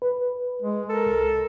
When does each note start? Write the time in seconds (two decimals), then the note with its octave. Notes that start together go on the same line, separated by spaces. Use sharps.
0.02 B4
0.62 G#3
0.89 A4 A#4
1.06 C2